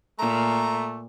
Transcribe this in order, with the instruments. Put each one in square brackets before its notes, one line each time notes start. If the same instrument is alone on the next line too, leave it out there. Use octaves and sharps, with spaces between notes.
[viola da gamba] A#2 [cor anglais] A3 [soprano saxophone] A#5